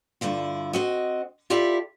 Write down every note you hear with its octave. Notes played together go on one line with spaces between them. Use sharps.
G2 D3 E4 F4
C4 F#4 D#5
E4 F4 G4 A4 D5 E5